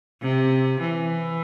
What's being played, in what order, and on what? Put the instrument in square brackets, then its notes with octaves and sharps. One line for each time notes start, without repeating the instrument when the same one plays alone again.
[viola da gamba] C3
E3